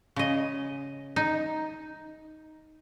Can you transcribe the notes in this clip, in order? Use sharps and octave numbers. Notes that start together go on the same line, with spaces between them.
C#3 D#5
D#4